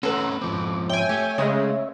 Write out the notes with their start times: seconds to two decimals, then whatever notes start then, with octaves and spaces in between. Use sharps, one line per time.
0.03 A3 C4 C#4 A4 B4 F#5 A#5 C6
0.41 G#2 F3 C4 D6
0.89 C#5 E5 G5 G#5
1.09 A3 G4
1.38 C#3 G#3 D#5